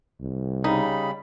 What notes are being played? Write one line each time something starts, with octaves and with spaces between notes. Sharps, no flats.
C2
C#3 G3 D#4 B5